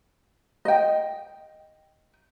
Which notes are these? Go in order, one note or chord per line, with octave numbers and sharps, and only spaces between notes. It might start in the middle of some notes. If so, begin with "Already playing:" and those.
D#5 G5